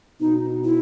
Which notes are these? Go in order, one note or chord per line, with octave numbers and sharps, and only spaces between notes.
B2 D#4
E4